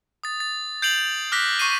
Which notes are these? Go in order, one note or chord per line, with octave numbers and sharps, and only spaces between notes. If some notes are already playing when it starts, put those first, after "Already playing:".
D#6 A6
A6
G6 C7 D7 F7 F#7
D6 F6 F#6 A#6 B6
C#6 C7 D#7